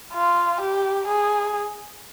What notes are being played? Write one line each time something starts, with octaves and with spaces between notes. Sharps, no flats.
F4
G4
G#4